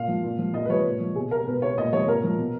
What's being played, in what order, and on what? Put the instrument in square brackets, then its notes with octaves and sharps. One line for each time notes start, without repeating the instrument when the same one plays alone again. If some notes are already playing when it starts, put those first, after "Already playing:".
Already playing: [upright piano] A#2 F5
F3
A#2
F3
A#2 D#5
B4
F3 C#5
A#2
F3
B2 G#4
A#4
B2 B4
C#5
A#2 D#5
F3 C#5
A#2 A#4
F3
B2